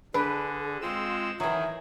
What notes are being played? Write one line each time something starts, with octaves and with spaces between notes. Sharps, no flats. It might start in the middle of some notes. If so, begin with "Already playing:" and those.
D3 D4 G#4 B4
G#3 C4 F4 E6
D#3 E3 F#3 G#4 E5